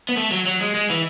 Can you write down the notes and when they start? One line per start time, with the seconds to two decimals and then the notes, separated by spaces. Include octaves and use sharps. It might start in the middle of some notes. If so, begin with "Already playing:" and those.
0.09 B3
0.17 A3
0.31 F#3
0.46 F#3
0.61 G#3
0.74 G#3
0.90 E3